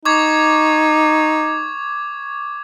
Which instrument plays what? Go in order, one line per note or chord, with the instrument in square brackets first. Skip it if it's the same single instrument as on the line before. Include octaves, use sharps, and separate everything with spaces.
[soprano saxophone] D#4 [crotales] C#6 D6 G#6